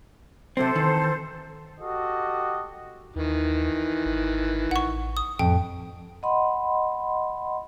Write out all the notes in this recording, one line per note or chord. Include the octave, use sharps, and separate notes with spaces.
C3 F#3 C4 A4 C5
D#3 E3
F#4 G4 A4 D#5
D#2 D#3 E3
G#1
A1 F#5 C#6
D#6
F2 A2 G5
D#5 F#5 B5 C6